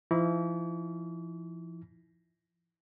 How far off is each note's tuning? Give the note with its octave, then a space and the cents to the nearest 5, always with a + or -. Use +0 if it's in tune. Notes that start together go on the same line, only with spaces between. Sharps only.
F3 -40 E4 -35 D6 -45